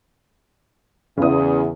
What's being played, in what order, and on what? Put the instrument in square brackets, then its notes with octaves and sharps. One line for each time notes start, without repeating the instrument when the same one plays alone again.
[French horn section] E2 [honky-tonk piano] C#3 D#6